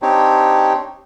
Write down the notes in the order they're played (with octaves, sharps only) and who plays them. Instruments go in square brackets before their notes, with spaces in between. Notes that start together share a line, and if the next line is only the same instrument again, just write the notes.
[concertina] C4 D4 D#4 G4 C#5